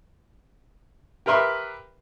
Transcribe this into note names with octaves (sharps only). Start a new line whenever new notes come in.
G4 A#4 B4 E5 C6